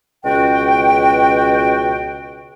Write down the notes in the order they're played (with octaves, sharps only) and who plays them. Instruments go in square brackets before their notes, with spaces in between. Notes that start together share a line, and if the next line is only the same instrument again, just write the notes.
[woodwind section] C#2 B2 F#4 G5